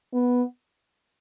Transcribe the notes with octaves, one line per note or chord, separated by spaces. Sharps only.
B3